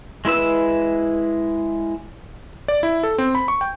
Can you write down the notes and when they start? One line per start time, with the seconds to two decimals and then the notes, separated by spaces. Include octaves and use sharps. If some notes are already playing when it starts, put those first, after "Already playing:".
0.25 G#3 E4 B4 E6
2.68 D5
2.83 E4
3.03 A4
3.18 C4
3.35 B5
3.48 C#6
3.61 G5